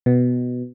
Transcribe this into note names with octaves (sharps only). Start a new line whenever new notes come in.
B2